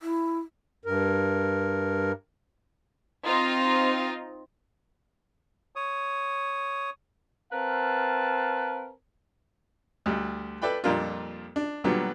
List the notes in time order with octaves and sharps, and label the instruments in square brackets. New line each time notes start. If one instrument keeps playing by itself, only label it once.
[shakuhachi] E4
[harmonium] G2 A#4
[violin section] C4 D#4 F4
[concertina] C#5 D#6
[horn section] C4 A#4 B4 F5 A5
[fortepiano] D2 G3
A4 B4 D5 G5 B5
F2 A#2 G3 A#3 D4 F4
D4
A#2 D3 F#3 G3 B3